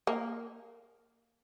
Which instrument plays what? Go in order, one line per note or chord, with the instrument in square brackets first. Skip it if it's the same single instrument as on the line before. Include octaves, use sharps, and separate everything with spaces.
[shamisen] A#3